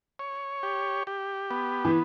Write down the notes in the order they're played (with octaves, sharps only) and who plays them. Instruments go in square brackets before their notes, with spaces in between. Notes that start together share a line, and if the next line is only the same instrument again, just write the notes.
[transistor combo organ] C#5
G4
G4
B3
[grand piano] E3